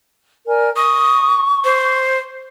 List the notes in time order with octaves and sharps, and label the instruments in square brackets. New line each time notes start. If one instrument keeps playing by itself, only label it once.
[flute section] A#4 D5 G#5
[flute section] C#6 [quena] D#6
[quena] C5